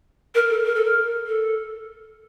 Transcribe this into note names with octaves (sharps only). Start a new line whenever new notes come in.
A#4
A4
A#4
A4
A#4
A4